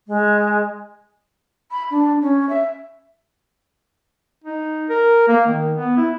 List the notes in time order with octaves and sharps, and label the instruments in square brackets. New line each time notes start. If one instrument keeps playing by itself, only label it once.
[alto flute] G#3
[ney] B5
D4
C#4
E5
[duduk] D#4
A#4
A#3
D#3
B3
E4